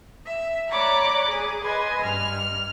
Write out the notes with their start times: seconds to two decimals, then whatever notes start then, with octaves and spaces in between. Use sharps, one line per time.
0.26 E5
0.70 C#5 D5 A#5 B5 D6 F#6
1.28 G#4
1.62 B4 D#5 G#5 C6
2.01 G2 F6